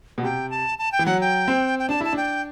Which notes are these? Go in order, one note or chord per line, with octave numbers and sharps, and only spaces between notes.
B2
C3 G5
A5
A5
G5
E3
F#3 F#5
G5
C4
G5
D4 A5
E4 A5
D4 G5